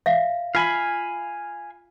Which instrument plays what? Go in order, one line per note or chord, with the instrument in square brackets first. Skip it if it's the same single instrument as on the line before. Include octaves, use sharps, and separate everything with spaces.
[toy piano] E5 F5
[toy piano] F4 [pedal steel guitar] F5 G#5 B5